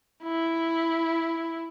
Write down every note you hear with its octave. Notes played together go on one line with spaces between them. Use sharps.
E4